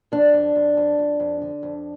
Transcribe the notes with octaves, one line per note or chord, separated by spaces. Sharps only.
F2 D4
F2
F2
F2
F2
F2
D3
F2